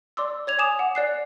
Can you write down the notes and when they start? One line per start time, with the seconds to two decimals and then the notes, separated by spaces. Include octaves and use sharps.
0.17 D5 C6 D6 E6
0.47 C#5 G#6 F7
0.59 G#5 D6 D#6 E7 F7
0.79 F#5
0.95 D5 F#6 C7